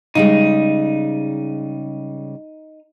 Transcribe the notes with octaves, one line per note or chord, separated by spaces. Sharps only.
C#3 G3 G#3 D#4